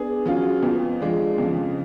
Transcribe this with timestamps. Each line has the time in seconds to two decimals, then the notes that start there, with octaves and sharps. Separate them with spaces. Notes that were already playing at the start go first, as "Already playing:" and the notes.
Already playing: B3 D4 G#4
0.26 F#3 C#4 F4 G#4
0.63 F2 F3 B3
1.00 F3 G#3 D4
1.38 F2 C#3 F3